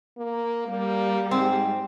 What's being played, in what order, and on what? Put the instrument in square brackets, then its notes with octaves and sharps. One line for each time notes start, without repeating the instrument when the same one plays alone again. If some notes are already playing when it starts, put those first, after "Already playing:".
[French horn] A#3
[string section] G3 [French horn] A#3
[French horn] G#2 [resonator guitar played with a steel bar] C4